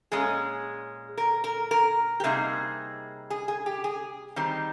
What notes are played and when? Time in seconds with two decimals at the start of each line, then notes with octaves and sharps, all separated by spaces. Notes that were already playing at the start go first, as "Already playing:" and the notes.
0.12 A#2 G#3 C#4 G#4
1.17 A#4
1.44 A#4
1.71 A#4
2.20 G4
2.24 C3 G3 A#3 D#4 G#4
3.30 G#4
3.48 G#4
3.66 G4
3.84 G#4
4.36 D#3 G3 C4 D#4